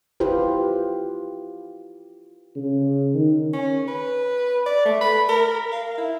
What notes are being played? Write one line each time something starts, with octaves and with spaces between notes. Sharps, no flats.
E4 F4 G4 B4 C5
C#3
D#3
C#4
B4
D5
A3
B5
A#4
F5
E4